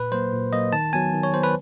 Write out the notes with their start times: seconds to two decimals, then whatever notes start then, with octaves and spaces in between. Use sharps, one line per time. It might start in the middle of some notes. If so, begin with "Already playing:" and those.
Already playing: A#2 B4
0.12 F#3 A#3 C5
0.33 A#2
0.53 F#3 A#3 D#5
0.73 D#3 A5
0.93 F#3 B3 G#5
1.14 D#3
1.23 C#5
1.33 F#3 B3 C5
1.43 B4